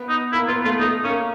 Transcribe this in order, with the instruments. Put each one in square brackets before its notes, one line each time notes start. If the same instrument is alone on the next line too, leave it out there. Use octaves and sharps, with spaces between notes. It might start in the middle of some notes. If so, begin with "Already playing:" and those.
Already playing: [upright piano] B3
[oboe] D#4
[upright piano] A#3 [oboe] E4
[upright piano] B3 [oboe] F4
[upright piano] A3 [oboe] F4
[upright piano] A3 [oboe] D#4
[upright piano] A#3 [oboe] C#4